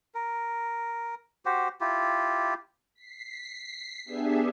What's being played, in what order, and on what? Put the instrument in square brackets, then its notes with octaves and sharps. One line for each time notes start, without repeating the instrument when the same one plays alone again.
[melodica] A#4
F#4 G4 C5
E4 F4 G4
[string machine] B6 C7
B3 D4 G4 G#4 E5